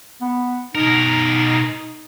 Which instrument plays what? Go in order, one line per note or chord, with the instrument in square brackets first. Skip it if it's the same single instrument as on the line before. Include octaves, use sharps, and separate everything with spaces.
[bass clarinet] B3
[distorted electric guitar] B2 A#4 [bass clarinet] D#4